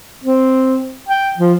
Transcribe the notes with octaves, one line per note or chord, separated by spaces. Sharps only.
C4
G5
F3